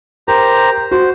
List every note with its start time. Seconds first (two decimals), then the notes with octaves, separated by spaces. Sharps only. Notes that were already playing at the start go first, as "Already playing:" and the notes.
0.28 G4 A#4 C5 A#5
0.91 F#4 C5